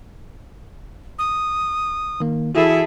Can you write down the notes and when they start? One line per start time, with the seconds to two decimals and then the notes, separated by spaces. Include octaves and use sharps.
1.19 D#6
2.20 D#3 A#3
2.55 E3 E4 F#4 G#4 A4 E5